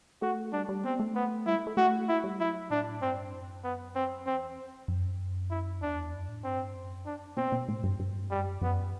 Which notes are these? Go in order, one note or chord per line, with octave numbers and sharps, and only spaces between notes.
A3 F#4
G3 D4
G3
B3 C4
A3
B3
G3 E4
A3
A3
A3 F#4
E4
G3
F#3 E4
A2 D4
G2 C4
F#2
B3
C4
E2 C4
F#2
E4
E2 D4
F#2
A2
G2 C4
F#2
D4
B2 C4
B2
A2
G2
G2
F#2 G3
F#2 B3